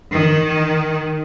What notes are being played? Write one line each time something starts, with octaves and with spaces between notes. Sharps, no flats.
D#3